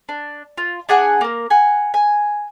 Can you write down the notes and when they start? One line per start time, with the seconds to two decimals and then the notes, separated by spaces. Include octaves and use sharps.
0.09 D4
0.58 F4
0.89 D4 G#4 F#5 G#5
1.21 A#3 A#4
1.50 F#5 G#5
1.94 G#5